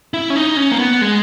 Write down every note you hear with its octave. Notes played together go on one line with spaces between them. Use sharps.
E4
C#4
D#4
C#4
A#3
B3
G#3